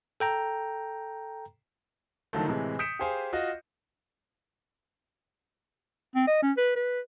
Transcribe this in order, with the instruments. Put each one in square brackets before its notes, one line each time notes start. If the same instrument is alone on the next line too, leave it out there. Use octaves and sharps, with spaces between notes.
[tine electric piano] A4 G5 A#5
[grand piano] D3 D#3 F3 F#3 A3
A2 C3 E3 G#3
D#6 G6 B6 C#7 D7 E7
G4 G#4 C5 F5 G#5
F4 F#4 D#5
[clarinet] C4
D#5
C#4
B4
B4